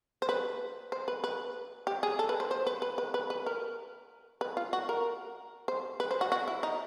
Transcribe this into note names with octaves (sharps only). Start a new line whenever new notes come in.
C5
B4
C5
B4
B4
G4
G#4
A4
B4
C5
C5
B4
B4
B4
B4
B4
A#4
B4
F4
F#4
A#4
C5
B4
C5
F#4
F#4
E4
D#4